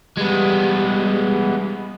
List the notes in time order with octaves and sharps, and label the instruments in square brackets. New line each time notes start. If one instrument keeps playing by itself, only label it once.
[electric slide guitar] G3 [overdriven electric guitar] G#3 B3